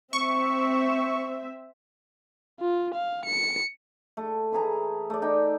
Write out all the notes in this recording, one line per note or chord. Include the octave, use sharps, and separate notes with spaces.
C4 E5 C#6
F4
F5
C#7
A3
E3 A3 G#4 A#5
A3 D5
D#4 G5